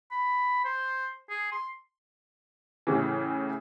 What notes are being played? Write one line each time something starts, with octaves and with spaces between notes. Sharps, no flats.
B5
C5
G#4
C6
A2 C#3 E3